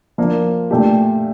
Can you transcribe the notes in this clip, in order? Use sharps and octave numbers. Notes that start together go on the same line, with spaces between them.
F3 A#3 D4
A#2 A3 D4 G4